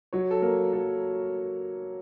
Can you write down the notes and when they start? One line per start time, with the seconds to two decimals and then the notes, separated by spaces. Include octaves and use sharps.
0.13 F#3 C#5
0.31 A4
0.42 A#3 A#4
0.73 F#3 A4